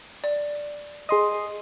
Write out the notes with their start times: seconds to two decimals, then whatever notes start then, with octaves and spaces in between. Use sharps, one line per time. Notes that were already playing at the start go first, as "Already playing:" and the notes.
0.24 D5
1.09 G#4 D#5 C6 D#6